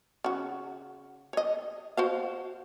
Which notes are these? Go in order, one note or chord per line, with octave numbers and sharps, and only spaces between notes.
C#3 F#4
C#5 D#5
F#4 C5 F5